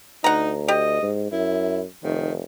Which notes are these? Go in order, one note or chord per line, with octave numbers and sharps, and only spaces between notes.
D2 D#4 F#5 A#5
G4 D#5
G#2
F#2 E4
F1 D#3